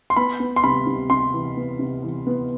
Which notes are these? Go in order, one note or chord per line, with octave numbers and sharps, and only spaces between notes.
C6
B3 B5
B3
C6
C3 B5
C3
C3 C6
E3
B3
C3
E3
B3